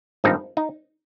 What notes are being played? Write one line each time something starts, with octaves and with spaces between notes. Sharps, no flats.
G#1 G2 F3 C4 D#4
D#4